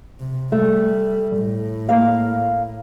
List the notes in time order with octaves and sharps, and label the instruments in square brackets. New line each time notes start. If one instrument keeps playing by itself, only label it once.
[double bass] C3
[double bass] G3 [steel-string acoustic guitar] A3
[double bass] A2
[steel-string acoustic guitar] A#3 F5